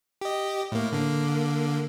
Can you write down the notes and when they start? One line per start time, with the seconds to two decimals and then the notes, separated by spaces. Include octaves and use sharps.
0.21 G4 D#5
0.72 A2 A#3
0.92 D3 A#3